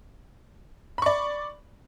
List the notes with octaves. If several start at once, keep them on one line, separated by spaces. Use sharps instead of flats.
D5 B5 C#6